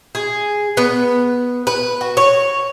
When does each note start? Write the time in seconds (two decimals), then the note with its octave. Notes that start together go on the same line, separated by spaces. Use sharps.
0.15 G#4
0.77 B3
1.67 B4
2.01 F#4
2.17 C#5